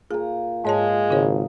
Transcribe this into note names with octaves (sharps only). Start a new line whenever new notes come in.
A#2 G#4 A#5
G#2 G#3 C#5 D#5 F5 A5
G#1 C#3 C#5